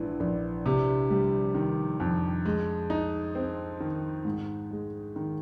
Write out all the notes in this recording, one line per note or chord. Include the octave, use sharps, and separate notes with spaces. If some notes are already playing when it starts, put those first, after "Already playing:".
Already playing: A#1 G#2 E3
A#1
C3
G3
D#3
F2
G#3
D#4
C4
D#3
G#2
G#3
D#3